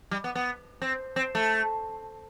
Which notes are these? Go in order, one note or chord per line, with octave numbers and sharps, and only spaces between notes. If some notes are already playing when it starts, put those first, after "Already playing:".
G3
B3
B3
C4
C4
A3